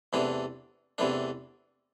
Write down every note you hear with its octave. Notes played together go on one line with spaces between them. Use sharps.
E2 C3 E3 A3 D4
E2 C3 E3 A3 D4